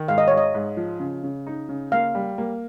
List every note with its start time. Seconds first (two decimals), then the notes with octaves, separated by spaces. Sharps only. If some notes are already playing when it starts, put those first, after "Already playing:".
Already playing: D#3
0.08 G#2 F5
0.18 D#5
0.28 G#2 C#5
0.37 D#5
0.55 G#2
0.77 F3
1.00 C#3
1.23 C#3
1.47 D#4
1.69 C#3
1.92 A#3 F5
2.15 G3
2.38 A#3